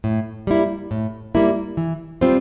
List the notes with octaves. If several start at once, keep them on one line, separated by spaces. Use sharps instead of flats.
A2
G3 A#3 E4
A2
G3 A#3 E4
E3
G3 C4 F4 C5